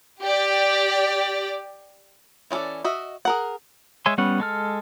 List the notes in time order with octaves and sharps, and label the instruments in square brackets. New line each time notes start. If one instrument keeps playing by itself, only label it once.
[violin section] G4 D5
[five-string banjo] E3 C#4 F4 A4 D5
F#4 D#5 E5
G#4 A#4 F#5
[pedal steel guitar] G#3 C#5 E5 G#5 C6
G3 B3 C#4 C#5 F#5
G#3 A4 F6